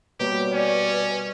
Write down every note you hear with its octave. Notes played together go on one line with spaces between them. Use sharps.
B2 G3 A#3 G4 C#5
C#4 D5